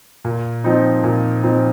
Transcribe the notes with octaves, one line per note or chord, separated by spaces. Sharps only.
A#2
F3 C4 D#4
A#2
F3 C4 D#4